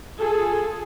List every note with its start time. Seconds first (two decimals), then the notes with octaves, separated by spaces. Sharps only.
0.20 F4 G#4 A4